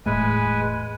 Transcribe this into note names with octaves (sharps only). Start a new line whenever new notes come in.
E1 A2 G#3 A3 B4 G#5